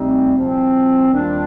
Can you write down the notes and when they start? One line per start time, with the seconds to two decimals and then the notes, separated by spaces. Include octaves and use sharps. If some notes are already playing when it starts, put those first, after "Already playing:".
Already playing: D2 C3 G3 C4 D#4
0.36 C2 A#2 F3 C4
1.11 D#2 D#3 G3 D4 F4